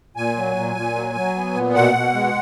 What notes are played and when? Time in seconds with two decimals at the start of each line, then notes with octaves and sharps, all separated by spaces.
0.16 A#2 G#5
0.36 F#3
0.56 A#2
0.76 A#2
0.95 F#3
1.16 F#3
1.35 B3
1.55 A#2
1.75 B2 F#5
1.94 B2
2.14 G#3